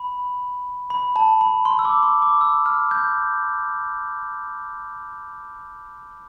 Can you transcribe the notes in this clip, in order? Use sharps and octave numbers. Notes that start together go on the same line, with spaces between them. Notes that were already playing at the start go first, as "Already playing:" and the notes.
Already playing: B5
B5
A5
B5
C6
E6
D6
C6
D6
E6
F6
G6